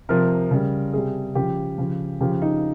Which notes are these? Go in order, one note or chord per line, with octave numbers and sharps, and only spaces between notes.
C3 F3 A#4
C#3 G3
C3 G3 G#4
C#3 F3 G4
C#3 F3
C#3 F3 G4
D#4